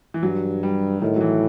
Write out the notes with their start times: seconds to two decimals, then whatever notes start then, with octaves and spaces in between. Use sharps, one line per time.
0.14 E3
0.23 G2 F#3
0.63 G3
1.02 A2 D#3
1.16 F#3
1.21 E3